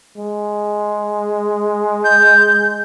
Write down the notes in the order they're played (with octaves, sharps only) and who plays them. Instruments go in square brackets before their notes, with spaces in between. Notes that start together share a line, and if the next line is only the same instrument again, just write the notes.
[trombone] G#3
[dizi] G6